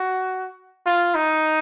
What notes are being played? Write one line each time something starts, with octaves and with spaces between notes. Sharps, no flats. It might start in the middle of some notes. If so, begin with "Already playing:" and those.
Already playing: F#4
F4
D#4